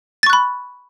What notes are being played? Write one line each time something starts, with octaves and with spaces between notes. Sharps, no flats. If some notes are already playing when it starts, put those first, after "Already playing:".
B5 C#6 F#6 A6